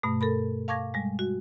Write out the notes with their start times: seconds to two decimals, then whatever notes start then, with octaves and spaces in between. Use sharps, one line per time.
0.03 G2 B2 A3
0.21 A4 A#4 B5
0.68 F5 A5 C#6 D6 G#6 A#6
0.94 G3 G#3
1.19 F#4